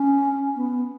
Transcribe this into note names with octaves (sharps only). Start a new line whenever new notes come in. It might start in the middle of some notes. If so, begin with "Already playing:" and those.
Already playing: C#4
B3